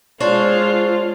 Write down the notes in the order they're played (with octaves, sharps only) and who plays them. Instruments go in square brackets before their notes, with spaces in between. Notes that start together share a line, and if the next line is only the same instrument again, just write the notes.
[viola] G#3 F4 [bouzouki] D4 C5 C#5